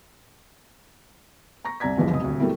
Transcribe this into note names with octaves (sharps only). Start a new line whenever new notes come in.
A#5 C#6 A#6
C2 C3 D5 A#5 G#6 B6
A#1 E2 G2 E3 F3 G#3
F#1 C#2 C3 D#5 D#6
D#1 D2 C3
F#3 G3 A3 A#3 C4 E4